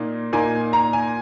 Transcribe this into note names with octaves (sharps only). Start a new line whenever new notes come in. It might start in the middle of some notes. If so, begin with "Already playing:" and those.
Already playing: A#2 A#3 D#4
A#2 A#3 D#4 G#5
A#5
G#5